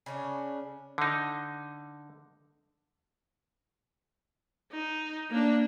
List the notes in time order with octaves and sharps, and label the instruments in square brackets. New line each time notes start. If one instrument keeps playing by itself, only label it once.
[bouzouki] C#3 C#4 D4
[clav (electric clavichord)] D3 D#4
[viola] D#4
A#3 D4